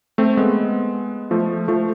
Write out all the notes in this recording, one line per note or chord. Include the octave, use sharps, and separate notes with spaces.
A3 C4
G#3 B3
F3 A3
F3 A3